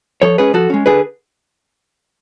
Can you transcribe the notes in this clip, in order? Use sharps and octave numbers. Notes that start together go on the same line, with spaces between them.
F3 A4 C#5
G#3 C#4 G#4 B4
F3 F#4 A4
G#3 C#4
D3 G#4 B4